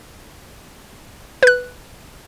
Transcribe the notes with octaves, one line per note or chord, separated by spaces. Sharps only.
B4 F#6